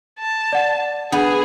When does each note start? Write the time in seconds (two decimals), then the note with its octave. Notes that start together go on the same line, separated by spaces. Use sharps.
0.20 A5
0.53 D5 F#5
1.12 B3 D4 G#4